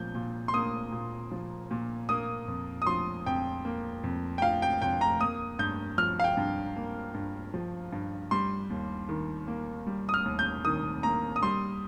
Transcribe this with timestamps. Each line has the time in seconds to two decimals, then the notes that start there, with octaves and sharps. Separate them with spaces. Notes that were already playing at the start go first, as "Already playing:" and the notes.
Already playing: A#2 F3 G6
0.15 A#2
0.48 C6
0.54 A#3 D#6
0.92 A#2
1.31 F3
1.71 A#2
2.09 A#3 D#6
2.48 F2
2.82 D#6
2.86 F3 C6
3.26 F2 G5
3.65 A#3
4.04 F2
4.38 G5
4.42 F3 F5
4.62 G5
4.82 F2 G5
5.01 A#5
5.20 A#3 D#6
5.59 G2 G6
5.98 F3 F6
6.20 F5
6.24 G5
6.37 G2
6.76 A#3
7.14 G2
7.54 F3
7.92 G2
8.31 G3 C6
8.70 D#2
9.09 D#3
9.48 A#3
9.87 G3
10.09 D#6
10.14 F6
10.25 D#2
10.39 G6
10.65 D#3 D#6
11.03 A#3 A#5
11.36 D#6
11.43 G3 C6